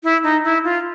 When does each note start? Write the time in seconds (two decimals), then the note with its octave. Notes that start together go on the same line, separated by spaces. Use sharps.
0.04 E4
0.24 D#4
0.44 E4
0.64 F4